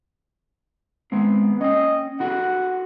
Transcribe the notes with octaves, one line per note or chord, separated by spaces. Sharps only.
G#3 B3 C4
C#4 D#5 G5
E4 F#4 A4 F#5